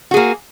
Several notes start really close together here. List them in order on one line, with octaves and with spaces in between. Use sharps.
F#4 G#4 A#3